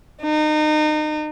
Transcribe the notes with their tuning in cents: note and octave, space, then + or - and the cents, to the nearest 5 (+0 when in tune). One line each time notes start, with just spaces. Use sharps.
D#4 -30